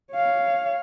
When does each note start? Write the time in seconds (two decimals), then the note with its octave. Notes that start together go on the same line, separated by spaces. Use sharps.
0.12 C#5 F5